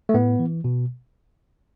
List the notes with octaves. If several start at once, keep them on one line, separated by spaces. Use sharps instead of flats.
A3
A2 B3
E3
B2